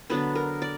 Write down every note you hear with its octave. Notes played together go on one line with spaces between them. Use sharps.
D3 F#3 B3 D4 B4
A#4
D5